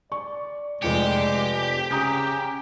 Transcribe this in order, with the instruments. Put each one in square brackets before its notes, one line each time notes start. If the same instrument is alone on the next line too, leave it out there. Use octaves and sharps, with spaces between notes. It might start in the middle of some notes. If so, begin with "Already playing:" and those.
[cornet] D5 [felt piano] C#6
[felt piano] F1 F2 C#7 [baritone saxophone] G#3 [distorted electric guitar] G4 [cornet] D5
[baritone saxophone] C#3 [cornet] G#5 [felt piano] A#5 D#6 G6